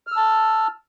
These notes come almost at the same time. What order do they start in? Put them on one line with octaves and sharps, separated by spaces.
F6 E6 A5